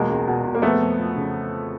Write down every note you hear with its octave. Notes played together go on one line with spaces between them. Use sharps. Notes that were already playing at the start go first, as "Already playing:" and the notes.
Already playing: E2 B2 G#3 A#3
C#2
B2
B2
A#3
F2 A3 B3
F2
F3
C#3